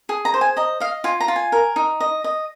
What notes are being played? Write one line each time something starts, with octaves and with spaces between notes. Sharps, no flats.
G#4
A#5
C5
G#5
D#5 A#5
D#5 F5
F4 G#5
A#5
F4
G#5
A#4
D#4
D#5
D#5